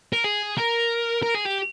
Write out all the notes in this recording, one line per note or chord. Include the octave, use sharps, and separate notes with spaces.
A#4
G#4
A#4
A#4
G#4
G4